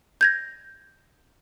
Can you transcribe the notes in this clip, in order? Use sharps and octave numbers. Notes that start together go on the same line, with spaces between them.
G6 G#6 A#6